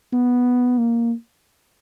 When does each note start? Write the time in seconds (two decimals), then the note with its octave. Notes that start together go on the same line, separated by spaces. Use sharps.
0.13 B3
0.78 A#3